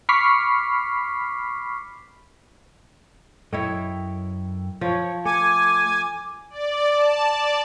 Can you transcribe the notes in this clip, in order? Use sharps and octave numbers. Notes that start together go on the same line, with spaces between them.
B5 C#6 D6 F6 B6 C7
F#2 E4 A4 C#5 D#5 G5
F3 C#5
A3 A4 G#5 D6
D5
A5
D5